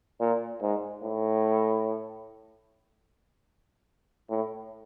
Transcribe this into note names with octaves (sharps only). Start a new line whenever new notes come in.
A#2
G#2
A2
A2